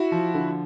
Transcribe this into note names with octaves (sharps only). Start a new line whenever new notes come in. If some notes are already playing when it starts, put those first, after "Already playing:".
Already playing: E4 F#4
F3
D3